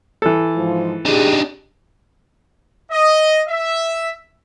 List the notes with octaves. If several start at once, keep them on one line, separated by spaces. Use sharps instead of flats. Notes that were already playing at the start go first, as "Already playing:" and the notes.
E3 A4
G#2 F3
D4 D#4 G4 G#4
D#5
E5